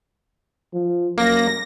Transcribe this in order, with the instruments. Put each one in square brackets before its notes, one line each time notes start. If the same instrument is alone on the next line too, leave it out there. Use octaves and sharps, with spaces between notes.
[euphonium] F3
[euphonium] F#2 [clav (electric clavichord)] A#3 [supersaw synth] A#6